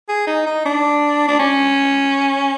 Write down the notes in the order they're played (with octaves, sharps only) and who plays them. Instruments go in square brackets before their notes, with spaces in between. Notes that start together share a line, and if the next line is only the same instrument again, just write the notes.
[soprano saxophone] G#4
D#4
D#4
D4
D4
C#4